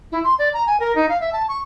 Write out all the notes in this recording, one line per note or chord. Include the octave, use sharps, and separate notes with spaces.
E4
C6
D5
A#5
G#5
A#4
D#4
F5
E5
A5
C#6